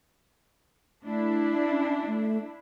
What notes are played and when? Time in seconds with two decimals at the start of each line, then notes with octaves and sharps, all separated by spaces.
1.05 A3 D4 E4
1.67 C#4
2.06 A3